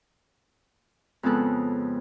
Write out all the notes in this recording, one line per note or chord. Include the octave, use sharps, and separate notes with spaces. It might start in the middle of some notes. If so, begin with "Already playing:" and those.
F2 C#3 G#3 B3 A4 F#6